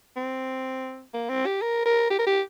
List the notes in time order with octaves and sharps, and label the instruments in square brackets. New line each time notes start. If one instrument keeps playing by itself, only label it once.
[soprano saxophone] C4
A#3
C4
G4
A#4
A#4
G4
A#4
G4